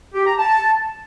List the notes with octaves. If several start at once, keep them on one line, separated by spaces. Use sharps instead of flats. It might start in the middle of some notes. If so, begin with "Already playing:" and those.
G4
A#5
A5